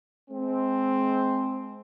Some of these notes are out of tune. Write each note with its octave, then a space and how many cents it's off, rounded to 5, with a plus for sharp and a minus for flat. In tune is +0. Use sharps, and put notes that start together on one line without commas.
G#3 +30 C4 +0